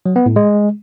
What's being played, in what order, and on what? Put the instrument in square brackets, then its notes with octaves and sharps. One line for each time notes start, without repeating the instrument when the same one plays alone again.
[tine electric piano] F#3
B3
A2
G#3